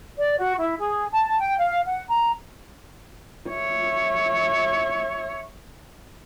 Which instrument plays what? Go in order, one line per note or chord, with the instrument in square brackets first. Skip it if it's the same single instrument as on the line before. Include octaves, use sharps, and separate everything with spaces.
[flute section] D5
F#4
E4
G#4
A5
G5
F5
F#5
A#5
[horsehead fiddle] C#5 E5